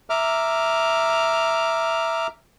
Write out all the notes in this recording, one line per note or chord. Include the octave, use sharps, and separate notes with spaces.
E5 A#5 D6 F6